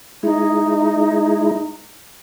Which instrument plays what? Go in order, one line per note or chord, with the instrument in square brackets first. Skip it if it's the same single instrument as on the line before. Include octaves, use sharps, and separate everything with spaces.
[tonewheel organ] G#3 E4 [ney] D#4